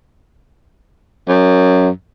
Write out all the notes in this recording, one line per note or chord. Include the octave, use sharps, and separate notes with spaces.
F#2